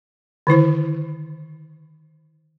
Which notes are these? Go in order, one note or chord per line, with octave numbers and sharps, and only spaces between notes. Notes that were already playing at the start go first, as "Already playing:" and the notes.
D3 D#3 E4 C5